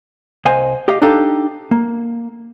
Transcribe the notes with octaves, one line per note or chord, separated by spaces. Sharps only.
C2 C5 D#5 F5 G#5
G4 D#5 F5
D4 D#4 G4 A4 F5
A#3